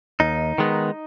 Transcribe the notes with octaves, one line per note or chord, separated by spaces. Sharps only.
D#2 D#4
D#3 G#3 B3